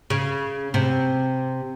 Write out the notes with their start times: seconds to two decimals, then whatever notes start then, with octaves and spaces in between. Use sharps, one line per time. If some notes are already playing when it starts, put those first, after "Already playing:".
0.10 C#3
0.74 C3